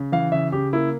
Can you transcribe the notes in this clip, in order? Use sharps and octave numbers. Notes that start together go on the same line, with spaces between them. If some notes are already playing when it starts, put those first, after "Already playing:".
Already playing: C#3
E3 F5
C#3 E5
C#3 G4
A#3 E4